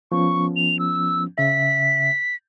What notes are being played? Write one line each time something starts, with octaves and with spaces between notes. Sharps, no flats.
F3 B3 C#4 C#6
F7
E6
C#3 E5 B6